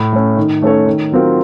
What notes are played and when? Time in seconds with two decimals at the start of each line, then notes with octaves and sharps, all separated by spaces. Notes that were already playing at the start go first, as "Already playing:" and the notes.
Already playing: A2
0.13 A3 C#4
0.37 D#3
0.62 A3 C#4 A4 C#5
0.86 D#3
1.12 F#3 C4 F4 A#4